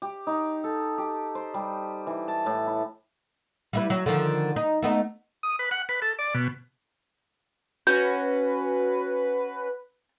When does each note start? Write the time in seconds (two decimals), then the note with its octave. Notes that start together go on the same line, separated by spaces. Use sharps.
0.02 G4
0.27 D#4
0.64 A4
0.98 G4
1.35 C5
1.54 G3
2.07 E3
2.28 A5
2.46 A2
2.67 E4
3.73 G3 E4 B4
3.90 F#3
4.06 D3 D#3 F3
4.56 D#4
4.82 A3 B3 D#4
5.43 D#6
5.59 B4
5.71 F#5
5.89 B4
6.02 A4
6.19 D5
6.34 B2
7.87 C#4 F#4 B4 G6